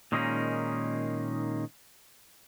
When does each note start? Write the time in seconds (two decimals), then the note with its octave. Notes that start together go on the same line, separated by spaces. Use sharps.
0.12 A#2 D#3 G#3 A#3 C#4 D#4